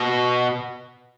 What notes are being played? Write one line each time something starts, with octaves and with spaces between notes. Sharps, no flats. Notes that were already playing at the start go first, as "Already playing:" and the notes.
Already playing: B2